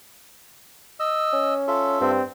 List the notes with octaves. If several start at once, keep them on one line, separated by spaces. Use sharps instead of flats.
D#5 E6
C#4
F4 A4 E5
G2 C4